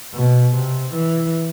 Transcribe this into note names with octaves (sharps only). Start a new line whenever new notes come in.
B2
C3
E3